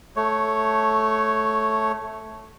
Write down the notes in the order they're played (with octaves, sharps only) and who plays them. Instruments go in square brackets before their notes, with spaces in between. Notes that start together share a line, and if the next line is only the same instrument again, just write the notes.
[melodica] A3 C#5